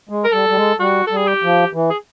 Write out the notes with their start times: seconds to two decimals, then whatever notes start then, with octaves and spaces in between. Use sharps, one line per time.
0.09 G#3
0.25 A#4
0.33 G3 A4
0.49 G3
0.56 G#3
0.80 G3 F#4
1.07 G3 A4
1.17 G#4
1.27 G4
1.43 F3
1.74 E3
1.90 G#4